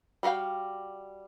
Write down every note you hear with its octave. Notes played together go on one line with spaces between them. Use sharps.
G3 F#4 B4 F5 G5